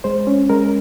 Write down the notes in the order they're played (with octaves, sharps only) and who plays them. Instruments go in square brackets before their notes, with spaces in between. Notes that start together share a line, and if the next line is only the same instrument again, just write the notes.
[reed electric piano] G#3 C5
C#4
G#3 A#4